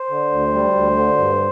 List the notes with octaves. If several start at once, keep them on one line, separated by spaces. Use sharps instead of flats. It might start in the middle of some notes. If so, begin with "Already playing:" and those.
Already playing: C5
D3
D2
G3
D2
D3
G2